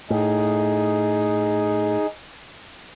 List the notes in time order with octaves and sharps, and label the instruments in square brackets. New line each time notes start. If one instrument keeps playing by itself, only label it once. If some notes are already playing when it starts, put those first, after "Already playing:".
[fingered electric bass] A2 [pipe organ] D#4 G#4